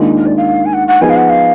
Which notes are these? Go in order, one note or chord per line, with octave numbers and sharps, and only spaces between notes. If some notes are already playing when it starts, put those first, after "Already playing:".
Already playing: D#2 D#3 G#3 D4 F4
A#4
D5
F5
G#5
F#5
F#5
F3 B3 D#4 G#4 G#5
F5
F#5
F5